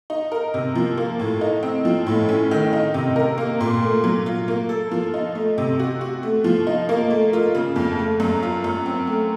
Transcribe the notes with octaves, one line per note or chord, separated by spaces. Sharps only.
D#4
A#4
C3
F3
A#3
A2
D#4
C4
F3
A2
C#4
D#3
D#4
C3
A#4
A#3
A#2
A3
F#3
F4
A#3
A4
F3
D#4
A3
C3
F#4
F#4
A3
F3
D#4
A#3
A3
F4
C#3
F2
A3
F#2
F4
F#2
C4
A3